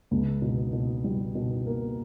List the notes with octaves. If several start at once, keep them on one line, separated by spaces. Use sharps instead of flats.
C#2
B2
B2
G3
B2
A#3